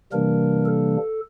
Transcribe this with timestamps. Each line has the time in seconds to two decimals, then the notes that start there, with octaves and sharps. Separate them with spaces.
0.13 C3 E3 G3 A#3 D4 A#4
0.66 A4